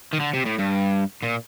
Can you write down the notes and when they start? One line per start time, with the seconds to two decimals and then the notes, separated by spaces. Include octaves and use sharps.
0.13 D#3
0.20 D3
0.34 C3
0.46 A2
0.59 G2
1.23 A#2